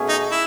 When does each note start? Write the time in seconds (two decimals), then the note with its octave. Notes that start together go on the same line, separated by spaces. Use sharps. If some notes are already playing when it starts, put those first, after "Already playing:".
Already playing: B2 A3 C#4 G#4
0.09 D#4
0.31 E4